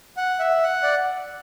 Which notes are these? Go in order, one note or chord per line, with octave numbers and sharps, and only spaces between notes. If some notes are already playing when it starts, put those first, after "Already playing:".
F#5
E5
F#5
D5